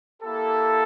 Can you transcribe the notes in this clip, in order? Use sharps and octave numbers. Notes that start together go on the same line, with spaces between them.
A#3 E4 G4 A4